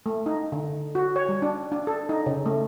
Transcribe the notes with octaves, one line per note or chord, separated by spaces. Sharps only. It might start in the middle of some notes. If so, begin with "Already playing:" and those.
A3
D#4
D3
F#4
C#5
G3
D4
D4
A4
D#4
C#3
A3